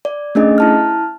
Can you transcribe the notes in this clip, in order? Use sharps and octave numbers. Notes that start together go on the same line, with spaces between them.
D5
A3 C#4 D4 G#4 D#5
E4 A5 F6